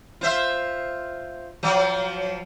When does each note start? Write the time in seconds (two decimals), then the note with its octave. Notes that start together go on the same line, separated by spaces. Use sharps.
0.21 F4 C5 E5
1.63 F3 F#3